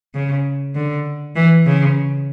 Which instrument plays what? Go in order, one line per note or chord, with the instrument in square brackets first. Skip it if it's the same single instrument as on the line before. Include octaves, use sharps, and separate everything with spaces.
[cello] C#3
D3
E3
C#3